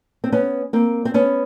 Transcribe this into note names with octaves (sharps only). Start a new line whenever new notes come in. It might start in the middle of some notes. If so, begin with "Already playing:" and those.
C4
B3 C#4
A#3 C4
C4
B3 C#4